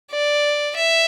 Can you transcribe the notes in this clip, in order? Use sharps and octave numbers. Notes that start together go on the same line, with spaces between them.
D5
E5